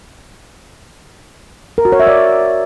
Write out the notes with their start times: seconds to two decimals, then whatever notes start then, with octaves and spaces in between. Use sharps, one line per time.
1.78 A#4
1.85 F#4
1.92 C#5
2.00 E5
2.07 D5